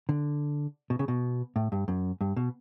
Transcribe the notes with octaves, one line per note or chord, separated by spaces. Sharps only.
D3
B2
C#3
B2
A2
G2
F#2
G2
B2